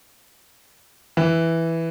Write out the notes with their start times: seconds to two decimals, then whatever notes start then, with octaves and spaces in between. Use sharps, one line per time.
1.17 E3